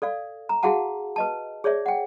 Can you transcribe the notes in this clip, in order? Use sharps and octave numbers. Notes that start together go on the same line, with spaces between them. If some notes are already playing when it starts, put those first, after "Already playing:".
A4 D5 F5
A#5
E4 F#4 G#4 F5 F#5 A5
B4 D#5 A5
G#4 C#5 D5 E5
F#5 G5